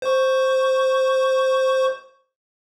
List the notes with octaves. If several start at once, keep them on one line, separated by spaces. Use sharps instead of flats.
C5 C#6